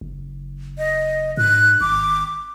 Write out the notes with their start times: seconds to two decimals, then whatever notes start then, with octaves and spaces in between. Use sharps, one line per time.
0.01 F#1
0.78 D#5
1.37 G#2 F#6
1.81 G#1 D6